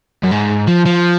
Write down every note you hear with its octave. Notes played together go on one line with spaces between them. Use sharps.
F#2
G#2
F3
F3